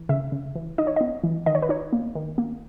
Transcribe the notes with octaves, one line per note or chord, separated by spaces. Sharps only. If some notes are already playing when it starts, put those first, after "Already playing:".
Already playing: E3
C#3 E5
C#3
E3
D#4 D#5
C#5
B3 D#5
E3
D#3 D#5
C#5
B4
D#4 C#5
A#3
D#3
A#3